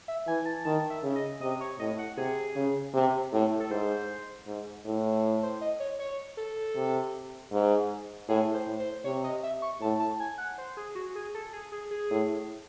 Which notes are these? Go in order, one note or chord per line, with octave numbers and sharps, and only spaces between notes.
E5
E3 G#5
A5
D#3 A5
E5
C#3
D#5
C3 D#5
C#5
A2 D#5
F#5
C3 G#4
C#3
C3
A2
A4
G#2 C5
G#2
A2
C5
D#5
C#5
C#5
A4
C3
G#2
A2 G#4
C5
A2
C5
C3 C#5
D#5
E5
C#6
A2 A5
A5
G#5
F#5
C5
G#4
F#4
G#4
A4
G#4
G#4
G#4
A2